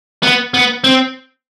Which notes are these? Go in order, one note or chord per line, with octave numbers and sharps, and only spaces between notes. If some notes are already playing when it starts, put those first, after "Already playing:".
B3
B3
C4